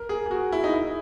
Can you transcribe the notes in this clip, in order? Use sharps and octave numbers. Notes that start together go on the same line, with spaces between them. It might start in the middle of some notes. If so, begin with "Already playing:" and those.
Already playing: A#4
G#4
G#4
F#4
E4
D#4
E4